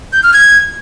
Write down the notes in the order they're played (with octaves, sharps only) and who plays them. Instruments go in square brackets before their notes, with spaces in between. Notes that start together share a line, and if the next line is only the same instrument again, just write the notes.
[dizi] G6
F6
G#6